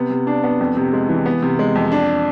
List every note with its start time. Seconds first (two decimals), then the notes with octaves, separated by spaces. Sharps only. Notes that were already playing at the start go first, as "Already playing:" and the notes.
Already playing: C3 B3
0.10 C3
0.27 D4
0.44 B3
0.60 F2
0.77 C3
0.93 G#3
1.09 E3
1.26 B3
1.43 C3
1.59 G#3
1.75 F2
1.92 D4